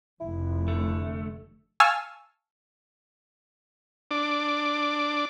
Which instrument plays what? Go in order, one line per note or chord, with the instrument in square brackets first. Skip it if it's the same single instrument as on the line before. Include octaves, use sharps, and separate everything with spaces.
[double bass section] F1 F2 [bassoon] E4
[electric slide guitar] D3 A3
[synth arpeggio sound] F5 G#5 A5 C#6 E6 F6
[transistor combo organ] D4 D6